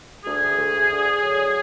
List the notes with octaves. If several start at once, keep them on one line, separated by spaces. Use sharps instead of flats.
D2 G#4
D2
D3
F#3